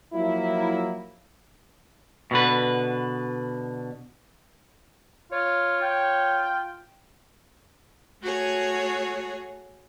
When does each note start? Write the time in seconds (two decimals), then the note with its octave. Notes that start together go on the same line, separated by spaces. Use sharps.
0.14 F3 F#3 A#3 E4
2.31 B2 D3 B4
5.32 F4 C#5
5.81 F4 G5
8.24 A3 F#4 G#4 C#5